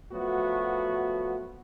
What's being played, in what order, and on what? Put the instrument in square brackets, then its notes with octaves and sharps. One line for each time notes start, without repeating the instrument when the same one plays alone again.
[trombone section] F3 F#3 A3 B3 F#4